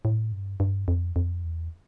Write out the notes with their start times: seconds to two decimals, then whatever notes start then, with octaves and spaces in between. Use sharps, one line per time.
0.05 A2
0.32 G2
0.60 G2
0.88 F2
1.16 F2
1.44 E2